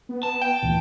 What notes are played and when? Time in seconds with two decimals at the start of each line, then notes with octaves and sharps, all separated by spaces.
0.09 B3
0.23 A5
0.41 G5
0.63 D2 A#2 E3